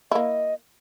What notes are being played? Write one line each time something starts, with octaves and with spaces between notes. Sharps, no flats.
A#3 E4 D#5